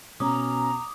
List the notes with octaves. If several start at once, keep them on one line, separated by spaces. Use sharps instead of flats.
B2 C#4 A#5 D6 D#6